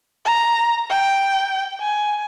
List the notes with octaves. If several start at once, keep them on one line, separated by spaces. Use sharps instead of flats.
A#5
G5
G#5